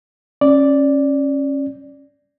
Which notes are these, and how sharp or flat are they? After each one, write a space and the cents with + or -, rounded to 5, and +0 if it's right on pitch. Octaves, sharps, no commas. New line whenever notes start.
C#4 -20 D5 +0